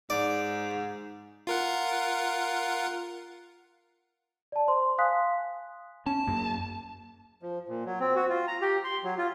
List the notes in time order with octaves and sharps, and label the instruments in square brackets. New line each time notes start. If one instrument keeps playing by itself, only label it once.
[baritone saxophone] G#2 [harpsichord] D5
[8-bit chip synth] F4 A#4 F#5
[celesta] D5 A5
C5 C6
F5 G#5 C6 D#6 F#6 B6
[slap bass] C#4 [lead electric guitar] A5
[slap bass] F#2 A#3
[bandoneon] F3
A#2
F#3
C4
F#4
F4
A#5
G4
C6
F#3
F4